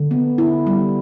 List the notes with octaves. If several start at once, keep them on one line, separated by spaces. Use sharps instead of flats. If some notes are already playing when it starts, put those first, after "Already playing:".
Already playing: D3
B3
E4
G3